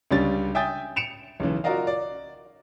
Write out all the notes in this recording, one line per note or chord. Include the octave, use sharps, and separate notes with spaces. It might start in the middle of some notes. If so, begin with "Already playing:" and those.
C#2 D3 G3 C#4 A6
E5 G5 G#5 D#6 G6 A6
C#7 D7 E7 F7
B1 C#3 E3
F4 F#4 A#4 D5 D#5 F5
D5